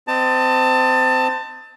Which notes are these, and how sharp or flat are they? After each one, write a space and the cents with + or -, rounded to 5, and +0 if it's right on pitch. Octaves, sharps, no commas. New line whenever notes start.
C4 -25 D#5 -20 A5 +20